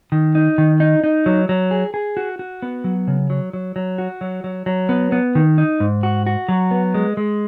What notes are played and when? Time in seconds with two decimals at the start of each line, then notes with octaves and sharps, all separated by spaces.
0.12 D#3
0.35 D#4
0.58 D#3
0.80 D#4
1.04 D#4
1.26 F#3
1.49 F#3
1.71 G#4
1.94 G#4
2.17 F#4
2.39 F#4
2.62 B3
2.84 F#3
3.08 C#3
3.30 F#3
3.53 F#3
3.76 F#3
3.98 F#4
4.21 F#3
4.44 F#3
4.66 F#3
4.89 B3
5.12 B3
5.35 D#3
5.58 D#4
5.80 G#2
6.03 F#4
6.27 F#4
6.49 F#3
6.71 B3
6.94 G#3
7.17 G#3